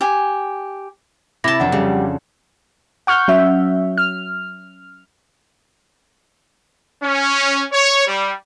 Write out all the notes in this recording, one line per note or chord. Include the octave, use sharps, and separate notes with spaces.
G4 G#5
C3 E4 A5 B5 D6 A#6
F2 F#3 D4 F#5
C#3 G3
F#5 C#6 F6 G6
F#3 C#4 E5
F6
C#4
C#5
G3